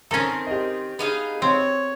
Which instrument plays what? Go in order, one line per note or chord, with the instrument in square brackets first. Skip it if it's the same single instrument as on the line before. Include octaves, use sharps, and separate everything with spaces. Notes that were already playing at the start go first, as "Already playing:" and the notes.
[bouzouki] D#3 C4 [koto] C#4 A4 [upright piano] A#5 A#6
[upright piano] G4 D#5
[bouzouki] B3 D#4 F5 [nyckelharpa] G#4
[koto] C4 [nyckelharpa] C#5